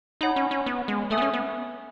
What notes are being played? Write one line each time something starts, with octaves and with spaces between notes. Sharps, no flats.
D#4 C#5 F#5 B5
C#4
C#4
B3
G#3
A3 A4 E5 G#5 D#6
B3
C#4
B3